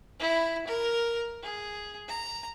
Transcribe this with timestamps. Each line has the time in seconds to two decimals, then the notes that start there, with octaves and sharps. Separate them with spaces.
0.20 E4
0.67 A#4
1.43 G#4
2.08 A#5